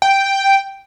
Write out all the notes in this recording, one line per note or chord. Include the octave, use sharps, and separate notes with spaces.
G5